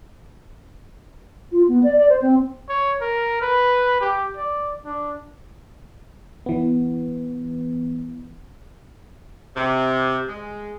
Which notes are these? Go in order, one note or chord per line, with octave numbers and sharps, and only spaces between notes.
F4
B3
D5
D5
C5
C4
C#5
A#4
B4
G4
D5
D4
E3 B3
C3
G#3